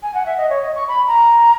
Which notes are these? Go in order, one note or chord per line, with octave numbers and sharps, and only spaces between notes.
G#5
F#5
E5
D#5
C#5
D#5
C#6
B5
A#5